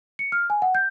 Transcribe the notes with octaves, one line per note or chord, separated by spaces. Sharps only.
C#7
F6
G#5
F#5
G6